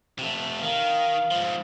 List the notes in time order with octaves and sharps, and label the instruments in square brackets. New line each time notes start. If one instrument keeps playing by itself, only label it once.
[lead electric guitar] C3 A3
[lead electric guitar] D#3 [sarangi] F5
[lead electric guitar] G#2 F3